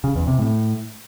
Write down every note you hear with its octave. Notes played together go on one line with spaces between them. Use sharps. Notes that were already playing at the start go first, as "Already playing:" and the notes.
C#3
E2
C3
A2